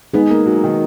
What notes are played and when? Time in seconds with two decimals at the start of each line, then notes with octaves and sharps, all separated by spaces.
0.14 G#3 B3 D#4 G#4
0.30 A#3
0.46 F#3
0.64 D#3